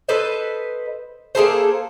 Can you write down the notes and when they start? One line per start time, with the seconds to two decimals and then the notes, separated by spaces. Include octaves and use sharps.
0.09 A4 B4 C5 D#5
1.35 A#3 G#4 A4 C5